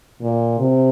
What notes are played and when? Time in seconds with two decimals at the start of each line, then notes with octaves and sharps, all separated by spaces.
0.21 A#2
0.59 C3